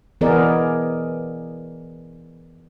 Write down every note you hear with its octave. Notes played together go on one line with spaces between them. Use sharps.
E3 B3 G#4 A#4 D5 D#5